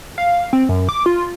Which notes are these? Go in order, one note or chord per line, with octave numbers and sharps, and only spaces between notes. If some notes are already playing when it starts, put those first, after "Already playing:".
F5
C4
F#2
D6
F4